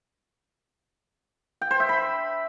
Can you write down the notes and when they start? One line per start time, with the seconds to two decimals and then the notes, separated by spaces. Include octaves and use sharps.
1.61 G5
1.71 C5
1.80 E5
1.89 B5